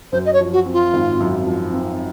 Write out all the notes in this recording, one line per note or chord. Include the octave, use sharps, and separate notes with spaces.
F#2 C5
D#5
C#5
F3
F#4
C4
F4
G#1
F#2
F3
C4